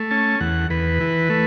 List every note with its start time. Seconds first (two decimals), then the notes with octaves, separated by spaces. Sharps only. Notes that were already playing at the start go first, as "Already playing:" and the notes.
Already playing: A3
0.11 C#4 A5
0.40 E2 F#5
0.70 E2 B4
1.00 E3
1.30 A3